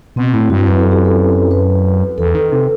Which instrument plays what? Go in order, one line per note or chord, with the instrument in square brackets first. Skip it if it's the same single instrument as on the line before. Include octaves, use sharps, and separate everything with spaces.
[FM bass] B2 [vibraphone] C4
[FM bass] A2 [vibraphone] E4
[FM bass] G2 [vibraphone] F#4
[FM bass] F#2 [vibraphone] B4
[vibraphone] A4
G4
A4
B4
[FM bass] E2 [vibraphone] A4
[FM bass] D#3
C3